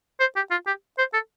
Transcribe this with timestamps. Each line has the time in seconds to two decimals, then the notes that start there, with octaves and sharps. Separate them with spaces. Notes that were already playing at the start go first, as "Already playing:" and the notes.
0.20 C5
0.36 G4
0.51 F4
0.67 G4
0.98 C5
1.14 A4